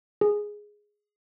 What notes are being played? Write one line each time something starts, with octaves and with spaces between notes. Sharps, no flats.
G#4